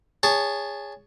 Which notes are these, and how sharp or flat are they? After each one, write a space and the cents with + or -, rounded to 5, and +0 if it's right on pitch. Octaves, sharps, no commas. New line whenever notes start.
G#4 -20 C#5 +15 A5 +0